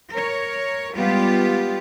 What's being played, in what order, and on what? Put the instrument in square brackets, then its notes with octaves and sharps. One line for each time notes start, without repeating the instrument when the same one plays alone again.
[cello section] A#4 C#5
G3 G#3 B3 F4 G4